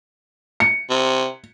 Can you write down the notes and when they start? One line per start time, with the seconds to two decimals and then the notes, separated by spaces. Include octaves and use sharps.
0.60 C#7
0.90 C3